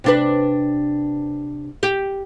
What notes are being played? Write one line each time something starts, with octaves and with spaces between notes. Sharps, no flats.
C3 D4 B4
G4